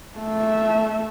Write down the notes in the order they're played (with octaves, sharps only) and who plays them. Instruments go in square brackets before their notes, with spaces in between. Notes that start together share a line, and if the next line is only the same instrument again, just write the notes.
[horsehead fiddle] A3 E5